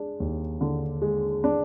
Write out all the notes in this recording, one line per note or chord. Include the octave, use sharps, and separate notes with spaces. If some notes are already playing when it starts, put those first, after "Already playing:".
Already playing: G#3 D4
D#2
D3
G#3
D4